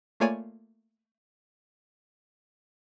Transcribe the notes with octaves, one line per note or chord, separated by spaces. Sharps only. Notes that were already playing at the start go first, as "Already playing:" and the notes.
A3 A#3 F4 C#5 D5 G#5